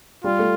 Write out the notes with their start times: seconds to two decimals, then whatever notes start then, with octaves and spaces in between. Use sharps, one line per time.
0.24 G3 F4
0.39 A3